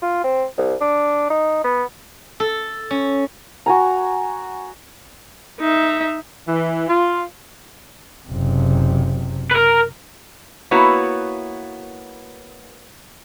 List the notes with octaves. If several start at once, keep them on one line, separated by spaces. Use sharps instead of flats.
F4
C4
C2
D4
D#4
B3
A4
C#4
F#4 G#5 A#5
D#4 E5
E3
F4
F#1 C3
A#4 B4
A#3 B3 E4 F#4 B4 C#5